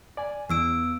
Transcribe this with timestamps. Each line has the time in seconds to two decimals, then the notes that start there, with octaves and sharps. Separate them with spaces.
0.17 D5 G#5
0.50 E2 B3 E6 D7